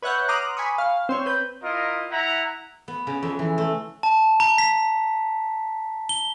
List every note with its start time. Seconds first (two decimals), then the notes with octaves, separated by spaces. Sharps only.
0.02 B4 C#5 E5 F#5 F#6 G6
0.28 A#5 C6 D6 D#6 F6 F#6
0.57 G#5 B5 C#6 D#6
0.78 F5
1.09 C4 C5 C#5
1.26 B4 G6
1.63 E4 F4 A#4 D#5
2.10 E4 E5 F#5 A#5
2.88 B3
3.07 C#3
3.23 F2
3.39 E3
3.58 A3
4.03 A5
4.40 A#5
4.58 B6
6.09 G7